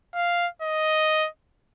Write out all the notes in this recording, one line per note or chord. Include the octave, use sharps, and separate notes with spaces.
F5
D#5